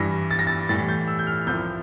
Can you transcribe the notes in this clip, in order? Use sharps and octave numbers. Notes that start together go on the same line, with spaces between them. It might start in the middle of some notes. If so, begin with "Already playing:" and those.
Already playing: G2 E3 G3 A#6
A6
A#6
A6
A2 E3 G3 A6
G6
E6
G6
F6
C2 C3 F3 G6